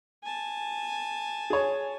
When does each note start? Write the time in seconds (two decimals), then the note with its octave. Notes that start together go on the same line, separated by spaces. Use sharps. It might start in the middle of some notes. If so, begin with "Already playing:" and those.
0.24 G#5 A5
1.50 G#4 C#5